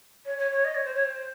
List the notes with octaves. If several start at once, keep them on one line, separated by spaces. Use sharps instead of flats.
C#5
C#5
C#5
D#5
C#5
C5
C#5
C5